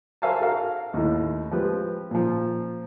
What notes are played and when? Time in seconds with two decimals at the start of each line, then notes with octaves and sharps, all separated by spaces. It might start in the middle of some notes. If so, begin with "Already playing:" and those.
0.22 A#4 C5 E5 F5 G#5 A5
0.40 F#4 A4 A#4 F5
0.94 D#2 A2
1.51 F3 G#3 G4 B4
2.11 A#2 F3